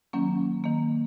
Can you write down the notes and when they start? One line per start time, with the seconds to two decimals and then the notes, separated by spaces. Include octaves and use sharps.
0.13 D#3 F#3 A#3 C#4
0.64 D#3 A#3